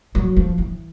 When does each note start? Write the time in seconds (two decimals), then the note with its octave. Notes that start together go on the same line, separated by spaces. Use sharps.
0.15 F#3
0.36 F3
0.58 E3